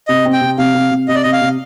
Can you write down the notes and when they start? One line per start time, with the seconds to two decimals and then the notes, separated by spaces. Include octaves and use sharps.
0.08 C3 D#5
0.25 C4
0.33 G5
0.41 C3
0.58 C3 F5
0.75 C3
0.91 C3
1.08 C3 D#5
1.15 D5
1.23 C3 D#5
1.33 F5
1.42 C3